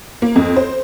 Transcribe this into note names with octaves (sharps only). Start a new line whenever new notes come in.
A#3
F2
C5